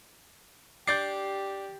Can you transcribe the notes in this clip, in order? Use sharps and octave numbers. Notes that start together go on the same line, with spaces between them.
D4 G4 D6 G6 A6 C7